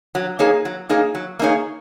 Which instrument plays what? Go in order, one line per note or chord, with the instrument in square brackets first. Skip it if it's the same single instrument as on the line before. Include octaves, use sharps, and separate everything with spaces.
[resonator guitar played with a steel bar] F#3
A#3 D#4 G#4 C#5
F#3
A#3 D#4 G#4 C#5
F#3
A#3 D#4 G#4 C#5